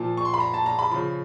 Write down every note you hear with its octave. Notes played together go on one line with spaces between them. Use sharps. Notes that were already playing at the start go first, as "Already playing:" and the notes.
Already playing: A#2 F3 A5
C#6
C6
B5
A#5
A5
A#5
B5
C#3 F3 B5